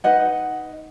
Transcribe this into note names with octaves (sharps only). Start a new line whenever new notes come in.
D#4 B4 D#5 F#5